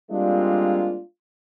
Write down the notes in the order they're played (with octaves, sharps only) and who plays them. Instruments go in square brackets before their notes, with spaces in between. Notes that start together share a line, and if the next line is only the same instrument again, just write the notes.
[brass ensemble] G3 G#3 A#3 C4 D4 F4